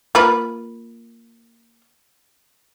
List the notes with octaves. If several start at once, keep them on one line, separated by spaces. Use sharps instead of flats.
A#3 F4 B4